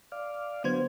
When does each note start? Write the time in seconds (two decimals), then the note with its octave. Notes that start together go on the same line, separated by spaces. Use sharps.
0.12 D5 F5
0.64 D3 F#3 B3 C5 G#6